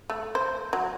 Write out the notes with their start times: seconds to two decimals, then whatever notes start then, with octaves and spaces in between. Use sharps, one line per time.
0.10 A3
0.35 C5
0.73 F#3